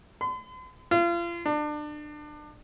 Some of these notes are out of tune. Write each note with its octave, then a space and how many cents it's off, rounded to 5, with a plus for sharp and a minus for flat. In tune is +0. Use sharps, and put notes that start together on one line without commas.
C6 -45
F4 -35
D4 +30